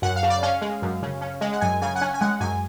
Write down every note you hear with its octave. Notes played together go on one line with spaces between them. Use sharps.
F#2 F#5
F5
C#3
D5
C#4 F5
G#3
F#2
C#3
C#4
G#3
F#5
F#2 G#5
C#3 G#5
F#5
C#4 G#5
G#5
G#3 F#5
F#2 G#5